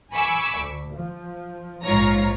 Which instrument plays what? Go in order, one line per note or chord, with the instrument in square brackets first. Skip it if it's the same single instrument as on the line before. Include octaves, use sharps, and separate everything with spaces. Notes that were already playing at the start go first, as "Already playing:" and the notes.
[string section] G#5 B5 C#6 D6 E6
D2
F3
A#1 G#2 F4 C#5 A#5